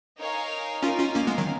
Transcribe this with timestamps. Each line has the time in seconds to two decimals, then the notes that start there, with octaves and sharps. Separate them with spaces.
0.18 D#4 A#4 C#5 F5 G#5
0.82 C#4 D#4 F4 A#4 F5 G#5
0.99 C#4 F4
1.15 A#3 C#4
1.27 G#3 B3
1.38 D#3 F#3